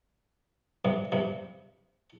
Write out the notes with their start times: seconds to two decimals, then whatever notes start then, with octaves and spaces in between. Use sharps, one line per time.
0.85 G2 C3
1.12 G2 C3